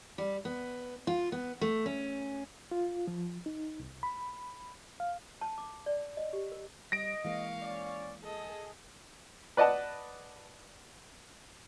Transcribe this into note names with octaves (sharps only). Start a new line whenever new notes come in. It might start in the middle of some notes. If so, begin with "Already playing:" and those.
G3
B3
F4
B3
A3
C#4
F4
F3
D#4
C2
B5
F5
A5
D6
D5
D#5
G4
A#4
G3 D#5 A#6 D7
E3 G#3 A#3 F5 C#6
C#4 D5
G#4 A4 D#5
B4 D5 D#5 F#5 A5